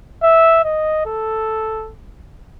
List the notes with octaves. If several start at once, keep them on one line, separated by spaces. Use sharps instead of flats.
E5
D#5
A4